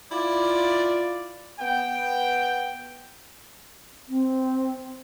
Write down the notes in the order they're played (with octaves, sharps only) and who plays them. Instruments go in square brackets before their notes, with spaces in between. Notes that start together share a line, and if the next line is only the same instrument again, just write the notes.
[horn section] E4 F4 D5
B3 G5
[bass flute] C4